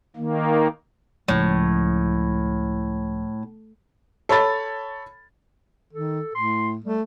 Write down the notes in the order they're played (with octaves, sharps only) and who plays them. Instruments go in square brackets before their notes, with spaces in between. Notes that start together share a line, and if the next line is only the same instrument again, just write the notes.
[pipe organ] D#3 A#3
[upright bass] C#2 F3 [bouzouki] A2
[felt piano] A4 C#5 B5 A6
[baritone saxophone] D#3 [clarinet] A4
[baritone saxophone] A2 [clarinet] C6
[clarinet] G3 [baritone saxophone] A3